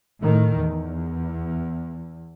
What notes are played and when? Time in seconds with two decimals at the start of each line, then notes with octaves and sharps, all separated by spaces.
0.21 A2 D#3
0.57 E2